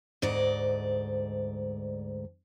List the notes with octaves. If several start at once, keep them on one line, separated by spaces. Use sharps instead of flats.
D2 G#2 D5 D#5